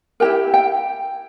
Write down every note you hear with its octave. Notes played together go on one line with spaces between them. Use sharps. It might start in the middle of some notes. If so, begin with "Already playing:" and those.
E4 G4 A#4 G5
G5